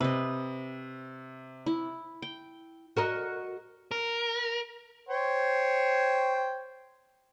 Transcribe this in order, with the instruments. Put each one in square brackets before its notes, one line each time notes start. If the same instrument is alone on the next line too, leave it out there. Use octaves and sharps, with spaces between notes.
[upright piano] C3 [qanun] B4 D#5
[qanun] E4
G5
[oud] F#4 A#4 D#5
[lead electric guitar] A#4
[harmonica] C5 C#5 G5